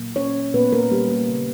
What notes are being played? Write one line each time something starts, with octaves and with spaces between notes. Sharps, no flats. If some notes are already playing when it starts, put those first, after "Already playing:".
Already playing: A#2 F#3 A#3
C#4 C#5
A#2 F#3 A#3 B3 B4
A#3 A#4
G3 G4
A#3
C#3 G3 A#3